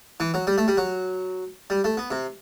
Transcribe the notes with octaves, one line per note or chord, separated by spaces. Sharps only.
E3
F#3
G3
A3
G3
F#3
G3
A3
B3
C3